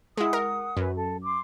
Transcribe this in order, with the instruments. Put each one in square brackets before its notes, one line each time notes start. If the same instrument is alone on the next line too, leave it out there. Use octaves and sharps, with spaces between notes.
[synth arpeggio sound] G#3 E4 [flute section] F#5 D#6
[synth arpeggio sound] A#4
[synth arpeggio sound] F#2 [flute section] B4
[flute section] A4
C6 D6